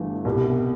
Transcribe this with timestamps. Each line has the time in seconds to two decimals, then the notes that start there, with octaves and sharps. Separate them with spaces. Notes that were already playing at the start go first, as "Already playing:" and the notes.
Already playing: G1 G2 E3 A3
0.25 C2 B2 G3